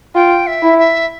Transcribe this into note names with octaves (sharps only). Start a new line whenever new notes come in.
F4 G5
E5
E4
E5